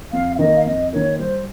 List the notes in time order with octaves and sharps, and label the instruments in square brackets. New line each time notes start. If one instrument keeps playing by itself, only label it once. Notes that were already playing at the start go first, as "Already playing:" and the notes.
[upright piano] F2 [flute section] F5
[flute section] F5
[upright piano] D#3 A#3 [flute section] D#5
[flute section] F5
[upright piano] F2 [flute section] D#5
[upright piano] D#3 A#3 [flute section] C#5
[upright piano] G3 [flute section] C5